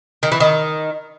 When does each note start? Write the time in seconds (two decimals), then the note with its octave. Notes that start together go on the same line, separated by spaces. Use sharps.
0.23 D#3
0.32 E3
0.40 D#3